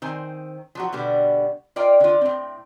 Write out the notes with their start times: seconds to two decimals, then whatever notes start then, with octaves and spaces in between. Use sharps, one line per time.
0.02 D#3 C4 C5 G#5
0.75 F3 F#3 F#4
0.92 B2 D3 G3 B3
1.76 F4 A#4 D5 D#5 G5
2.00 D3 F4
2.21 A2 C4